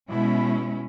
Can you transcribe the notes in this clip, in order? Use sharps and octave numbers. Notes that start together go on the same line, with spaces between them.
B2 G#3 C#4 E4